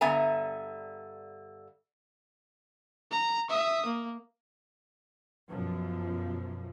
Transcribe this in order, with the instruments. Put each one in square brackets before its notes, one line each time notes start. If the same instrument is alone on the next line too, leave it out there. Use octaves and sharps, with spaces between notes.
[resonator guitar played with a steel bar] G2 D3 B3 E5 G#5 A#5
[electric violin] A#5
E5 D#6
A#3
[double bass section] F#2 B2 F3